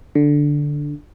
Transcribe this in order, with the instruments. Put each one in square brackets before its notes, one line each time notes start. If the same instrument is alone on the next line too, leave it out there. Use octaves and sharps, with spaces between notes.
[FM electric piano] D3